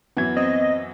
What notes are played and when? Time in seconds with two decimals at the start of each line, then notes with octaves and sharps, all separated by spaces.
0.17 F#2 E3 B3 F#4 G#6
0.37 C4 D#5